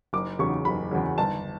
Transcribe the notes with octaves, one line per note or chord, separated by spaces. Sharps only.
F#1 D6
E2 C#3 F#3 C#6
F#1 B5
E2 C#3 F#3
G1 A5